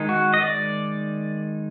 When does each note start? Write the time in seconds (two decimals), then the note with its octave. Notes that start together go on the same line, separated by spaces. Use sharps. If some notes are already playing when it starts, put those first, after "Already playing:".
Already playing: D#3 G#3 D#4
0.09 F#4
0.34 D#5
0.41 D5